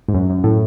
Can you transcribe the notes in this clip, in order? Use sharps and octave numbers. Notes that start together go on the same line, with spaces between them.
G#2
F#2
F#2
A2